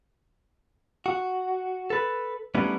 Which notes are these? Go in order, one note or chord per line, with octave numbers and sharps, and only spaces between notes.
F#4
A4 B4
G3 A3 B3 C#4 D#4 E4